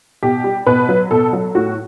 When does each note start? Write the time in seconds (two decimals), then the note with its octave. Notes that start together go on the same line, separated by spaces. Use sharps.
0.23 B2 G4
0.44 G3
0.66 B2 B4
0.89 F#3
1.11 B2 A4
1.33 F#3
1.55 A2 F#4